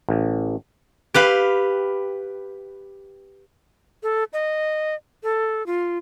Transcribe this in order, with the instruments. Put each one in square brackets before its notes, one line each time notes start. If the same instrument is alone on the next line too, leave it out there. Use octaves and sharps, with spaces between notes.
[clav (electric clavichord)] A1
[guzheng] G4 B4 F5
[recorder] A4
D#5
A4
F4